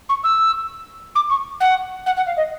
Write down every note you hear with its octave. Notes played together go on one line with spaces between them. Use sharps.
C#6
E6
D6
C#6
F#5
F#5
F#5
F5
D#5